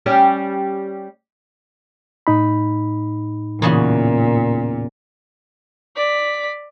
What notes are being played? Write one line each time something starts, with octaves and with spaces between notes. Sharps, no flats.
G3 C#4 G4
A2 D#4 B5
E2 A#2 C#3 F#4
D5 B6